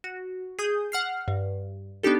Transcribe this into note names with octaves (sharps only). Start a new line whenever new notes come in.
F#4
G#4 D#6 G6
F#5 F6 C7
G2
B3 D4 D#4 G4 A4